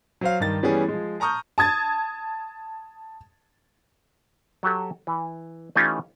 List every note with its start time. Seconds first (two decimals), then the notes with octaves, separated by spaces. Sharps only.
0.21 F#3 C5 F5
0.40 G2 D#3 A6
0.63 E3 G3 B3 C#4 G#4
0.88 F3 G#3
1.20 A5 A#5 C#6 D#6 F6 G6
1.58 A5 D#6 G#6 A6
4.63 F#3 F#4 G4 A4
5.07 E3
5.76 E3 A3 C#4 D#4 F4 G4